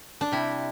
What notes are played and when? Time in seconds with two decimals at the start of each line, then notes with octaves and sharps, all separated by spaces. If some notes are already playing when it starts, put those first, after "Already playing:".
0.21 D4
0.32 C3 G3 E4